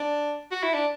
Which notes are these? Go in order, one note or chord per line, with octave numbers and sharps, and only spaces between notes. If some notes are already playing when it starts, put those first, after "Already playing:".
Already playing: D4
F#4
E4
D4